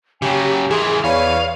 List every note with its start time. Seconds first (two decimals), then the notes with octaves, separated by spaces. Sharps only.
0.22 C#3 F#3 G4 C#5 G#5
0.71 E3 G#4 A#4 C6
1.04 E2 B4 C#5 D5 F5 B5 D#7